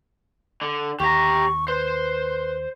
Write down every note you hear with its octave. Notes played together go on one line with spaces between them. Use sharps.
D3
D#2 G4 A#5 C#6
B4 C5